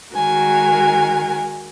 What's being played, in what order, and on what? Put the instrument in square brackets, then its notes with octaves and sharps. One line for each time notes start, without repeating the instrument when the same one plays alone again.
[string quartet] D#3 G#3 F#4 A#4 G#5